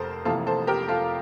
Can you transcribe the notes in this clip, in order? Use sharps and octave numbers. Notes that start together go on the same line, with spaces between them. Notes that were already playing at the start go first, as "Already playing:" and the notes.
Already playing: F1 F2 A4 A#4 C5
F1 F2 E3 A#3 F4 A4
A4 C5
G4 A#4
F4 A4